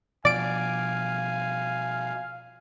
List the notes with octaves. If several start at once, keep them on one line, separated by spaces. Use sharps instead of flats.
B2 F3 D5 F5 G#5 D7